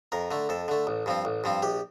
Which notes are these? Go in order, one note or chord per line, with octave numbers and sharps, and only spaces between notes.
F2 A#4
D3 A3
F2 A4
D3 A3
A1
G2 F3 C4
A1
G2 F3 C4
A#1 G4